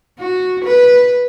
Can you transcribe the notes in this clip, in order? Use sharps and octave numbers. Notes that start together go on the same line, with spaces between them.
F#4
B4